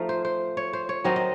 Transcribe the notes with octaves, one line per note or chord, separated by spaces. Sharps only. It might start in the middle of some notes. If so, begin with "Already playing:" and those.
Already playing: F3 A3 D#4 F5
C5
C5
C#5
C5
C#5
D#3 F#3 C4 D#4 D#5
D#5